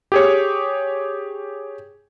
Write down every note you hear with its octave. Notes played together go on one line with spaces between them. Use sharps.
G4 G#4 C#5